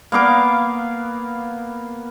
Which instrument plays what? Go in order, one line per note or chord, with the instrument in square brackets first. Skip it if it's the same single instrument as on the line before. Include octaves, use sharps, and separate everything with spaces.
[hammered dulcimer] A#3 B3 F5 D6